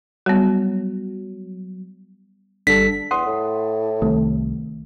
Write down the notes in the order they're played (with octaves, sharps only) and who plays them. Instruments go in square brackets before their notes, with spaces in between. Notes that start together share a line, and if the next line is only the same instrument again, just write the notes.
[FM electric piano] F#3 [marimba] G3 B3
[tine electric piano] G1 G3 A4 [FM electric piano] D3 [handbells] B6
[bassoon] E2 [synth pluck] F#5 C6 D#6
[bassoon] A2
[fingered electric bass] C2 [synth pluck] D#3 A3